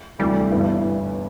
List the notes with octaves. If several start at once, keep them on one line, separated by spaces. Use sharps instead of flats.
D2 C3 E3 G3 A3
G1 G2 E3 B3 E4